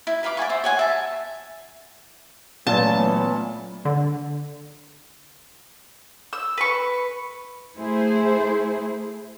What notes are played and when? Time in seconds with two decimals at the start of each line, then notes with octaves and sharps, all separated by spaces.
0.07 E4
0.23 B4 F5 B5 D6
0.37 D5 F#5 G#5 C#6
0.49 C5 E5
0.64 C#5 F#5 G#5
0.79 E5 A5 B5
2.67 A#2 E3 F#3 A3 B3 C#4 A5
3.85 D3
6.33 E6
6.58 B4 C#6
7.77 A3 E4 G#4 C5